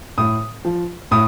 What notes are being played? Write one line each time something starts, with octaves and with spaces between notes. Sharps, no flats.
A2 D#6
F3
A2 D#6